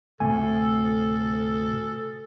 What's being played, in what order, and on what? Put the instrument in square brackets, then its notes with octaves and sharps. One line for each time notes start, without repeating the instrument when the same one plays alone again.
[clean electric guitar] D2 A2 C3 [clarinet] A4 [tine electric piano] G#5